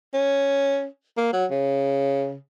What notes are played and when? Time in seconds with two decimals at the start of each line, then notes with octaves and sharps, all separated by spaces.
0.14 C#4
1.17 A#3
1.33 F#3
1.51 C#3